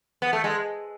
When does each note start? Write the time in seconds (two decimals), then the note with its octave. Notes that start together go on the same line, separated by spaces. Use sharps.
0.22 B3
0.33 A3
0.44 G#3